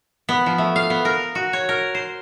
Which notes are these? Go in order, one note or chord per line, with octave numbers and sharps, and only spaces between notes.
B3
F3
A3
F5
B3
A#4
F#4
C#5
A#4
C5